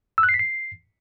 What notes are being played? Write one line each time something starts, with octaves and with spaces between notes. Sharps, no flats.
E6
F#6
C7
B6
C7